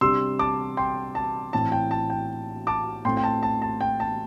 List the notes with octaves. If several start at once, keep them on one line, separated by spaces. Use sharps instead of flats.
C3 G3 D4 C6 E6
A5 D6
G5 C6
A5
A2 E3 C4 A5
G5
A5
G5
A5 D6
A2 A3 C4 G5 C6
G5
A5
A5
A5
G5
A5